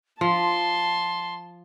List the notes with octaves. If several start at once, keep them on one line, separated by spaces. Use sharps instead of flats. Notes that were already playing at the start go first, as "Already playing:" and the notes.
F3 A5 C6